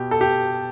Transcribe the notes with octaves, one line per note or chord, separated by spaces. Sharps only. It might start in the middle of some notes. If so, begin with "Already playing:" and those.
Already playing: B2 G4
A4
G4